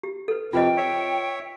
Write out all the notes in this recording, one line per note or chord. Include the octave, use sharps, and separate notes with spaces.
G4
A4 B4
F2 C3 F4 B4 D#5 G5
C#5 E5